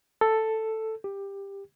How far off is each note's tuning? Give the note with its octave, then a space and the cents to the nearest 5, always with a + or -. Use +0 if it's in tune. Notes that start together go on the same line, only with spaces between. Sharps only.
A4 +5
G4 +15